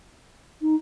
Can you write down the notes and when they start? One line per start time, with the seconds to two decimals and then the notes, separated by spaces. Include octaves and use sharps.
0.62 D#4